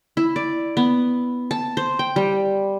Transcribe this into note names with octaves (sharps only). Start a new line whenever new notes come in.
E4
D5
B3
A5
C5
G5
G3